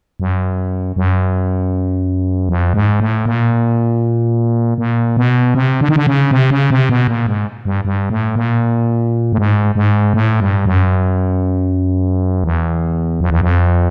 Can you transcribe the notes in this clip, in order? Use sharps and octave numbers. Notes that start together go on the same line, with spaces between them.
F#2
F#2
F2
G#2
A2
A#2
A#2
B2
C3
D3
D#3
D3
C#3
C3
C#3
C3
B2
A#2
G#2
G2
G2
A2
A#2
A2
G#2
G#2
A2
G2
F#2
E2
F2
E2
F2